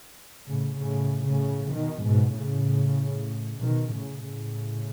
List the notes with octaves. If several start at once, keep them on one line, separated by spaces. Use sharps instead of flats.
A2 C#3
A2 C#3
A2 C#3
B2 D#3
G#2 B2
A2 C#3
B2 D#3
A2 C#3
A2 C#3